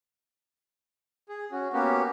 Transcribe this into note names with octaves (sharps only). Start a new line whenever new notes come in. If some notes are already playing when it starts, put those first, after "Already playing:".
G#4
C#4 F#4
A#3 B3 C#4 F#4 G4